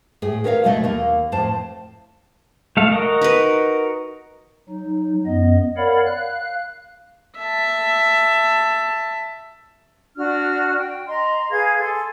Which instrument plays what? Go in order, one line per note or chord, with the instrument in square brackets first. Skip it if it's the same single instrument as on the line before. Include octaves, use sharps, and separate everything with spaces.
[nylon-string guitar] A2 G#4
F#4 A#4 B4 C#5 E5 F5
D#2 B2 F#3 A3 D#5 E5
D#2 A#3
F2 A2 C5 A5
[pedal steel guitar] A3 A4 F5
F#4 A#4 D#5
[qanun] D#4 B4
[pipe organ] F#3 D#4
F#2 B3 D#5
A#4 C#5 D5 F5 F#5 B5
F5 F#6
[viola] E5 A5
[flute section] D4 F#4 F6
G5
D#5 A#5 C6
G#4 B4 F5 G#6
A4 G#5 C6